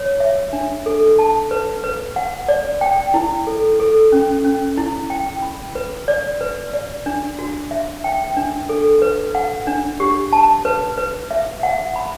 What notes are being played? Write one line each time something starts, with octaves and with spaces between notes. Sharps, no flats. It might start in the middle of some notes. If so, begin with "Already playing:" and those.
Already playing: C#5
E5
D4
A4
A5
B4
B4
F#5
D5
G5
E4
A4
A4
C#4
C#4
E4
G5
B5
B4
D5
B4
D5
D4
F#4
E5
G5
D4
A4
B4
F#5
D4
G4
A5
B4
B4
E5
F#5
B5